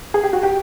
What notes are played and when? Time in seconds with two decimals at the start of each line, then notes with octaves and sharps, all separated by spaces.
0.14 G#4
0.23 G4
0.33 F#4
0.43 G4